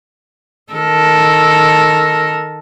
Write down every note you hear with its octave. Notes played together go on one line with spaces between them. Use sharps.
D#3 A4 A#4